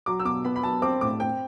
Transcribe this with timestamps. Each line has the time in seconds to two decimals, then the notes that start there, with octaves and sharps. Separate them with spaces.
0.06 F#3 D6
0.20 E6
0.25 B2 D6
0.45 B3 B5
0.56 B5
0.63 F#3 A5
0.82 C4 D6
1.01 A2 D6
1.20 C4 G5